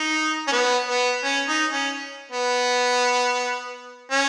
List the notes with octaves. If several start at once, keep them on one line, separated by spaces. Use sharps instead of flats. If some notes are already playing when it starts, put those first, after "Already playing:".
Already playing: D#4
C#4
B3
B3
C#4
D#4
C#4
B3
C#4